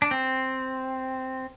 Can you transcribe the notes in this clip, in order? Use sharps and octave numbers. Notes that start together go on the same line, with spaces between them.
D4
C4